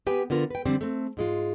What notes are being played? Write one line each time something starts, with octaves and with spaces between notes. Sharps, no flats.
B3 G4 B4 G5 G#5
D3 B3 F4 A#4
B4 G5
D3 G3 C4 D4 C5
A3 C4
G#2 G#3 F4